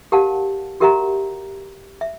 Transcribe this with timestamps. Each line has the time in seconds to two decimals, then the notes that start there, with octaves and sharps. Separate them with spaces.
0.12 G4 A#4 F5 F#5 A5
0.80 F#4 G4 A#4 E5 F#5 A#5
2.01 E5